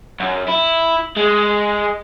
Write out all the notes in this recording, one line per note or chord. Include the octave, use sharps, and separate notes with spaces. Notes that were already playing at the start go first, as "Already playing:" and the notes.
F#2
E4
G#3